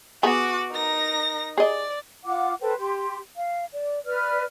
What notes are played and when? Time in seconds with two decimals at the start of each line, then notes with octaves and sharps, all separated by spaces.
0.23 B3 F#4 G#4 D6
0.69 D#4 A#4 A#6
1.58 G#4 D5 D#5
2.25 F4 F#5 D6
2.61 A4 B4 C5 G5
2.77 G4 C6
3.37 F5
3.70 D5
4.05 B4 D5 F6